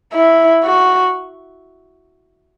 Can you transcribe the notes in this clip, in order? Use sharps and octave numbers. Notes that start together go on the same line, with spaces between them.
E4
F#4